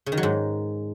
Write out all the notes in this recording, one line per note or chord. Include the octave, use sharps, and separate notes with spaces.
C#3
D#3
F#3
G#2